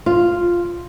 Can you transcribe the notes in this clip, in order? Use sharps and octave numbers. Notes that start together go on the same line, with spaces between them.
F4